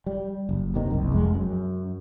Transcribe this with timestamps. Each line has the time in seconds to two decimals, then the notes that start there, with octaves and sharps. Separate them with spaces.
0.06 G3
0.49 F#1
0.74 D#2 C3 D#3
0.91 F#1 C2
1.12 F1 F2 G#3
1.34 F#2